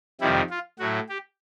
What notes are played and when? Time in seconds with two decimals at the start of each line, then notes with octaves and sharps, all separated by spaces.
0.21 F2 C3 D#3 G3 E4
0.50 F4
0.79 A2 F#3 A3 F#4
1.09 G4